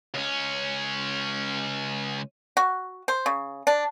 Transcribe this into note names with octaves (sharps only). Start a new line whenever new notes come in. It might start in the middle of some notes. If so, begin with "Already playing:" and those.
C#2 C#4
F#4
C5
C#3
D4